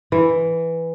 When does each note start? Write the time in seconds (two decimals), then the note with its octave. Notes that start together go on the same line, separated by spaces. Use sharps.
0.12 E3